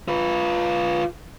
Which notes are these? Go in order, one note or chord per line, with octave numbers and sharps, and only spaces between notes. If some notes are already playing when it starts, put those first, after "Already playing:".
F4 B4